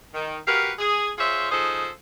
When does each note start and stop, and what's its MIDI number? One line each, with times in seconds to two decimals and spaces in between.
0.14 0.37 51
0.47 0.72 66
0.47 0.72 67
0.47 0.72 70
0.47 0.72 71
0.47 0.72 77
0.78 1.10 68
1.18 1.50 65
1.18 1.50 68
1.18 1.50 72
1.18 1.50 73
1.18 1.50 76
1.51 1.88 53
1.51 1.88 63
1.51 1.88 68
1.51 1.88 69
1.51 1.88 72